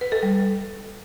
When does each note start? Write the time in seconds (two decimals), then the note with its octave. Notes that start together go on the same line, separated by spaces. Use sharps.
0.01 B4
0.12 A4
0.23 G3